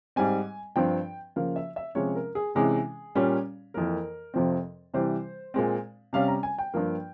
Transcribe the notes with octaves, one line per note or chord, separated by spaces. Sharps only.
G#2 G3 C4 G#5
G2 F3 C4 G5
C#3 F3 A#3 F5
E5
E5
C3 F3 G#3 C#4 C#5
A#4
G#4
C3 E3 G#3 C#4 G#4
A#2 G3 C#4
F2 E3 A#3 A#4
F2 C3 F3 C4
C3 E3 G3 C5
A#2 G#3 C4
C3 G3 C#4 F5
A#5
G#5
G5
G2 F3 A#3